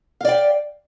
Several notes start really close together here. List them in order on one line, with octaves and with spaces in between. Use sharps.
F5 D5 G5